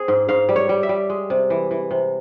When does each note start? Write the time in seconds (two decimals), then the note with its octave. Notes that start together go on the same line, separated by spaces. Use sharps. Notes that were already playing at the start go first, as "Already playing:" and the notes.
Already playing: C4 G#4
0.08 G#2
0.29 G#2 F5
0.49 G3
0.56 C#5
0.69 G3
0.83 E5
0.89 G3
1.10 G#3
1.30 C3
1.50 E3
1.71 E3
1.91 C3